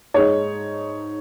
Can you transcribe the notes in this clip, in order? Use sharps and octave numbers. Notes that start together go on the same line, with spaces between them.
G#2 G#3 D#4 C#5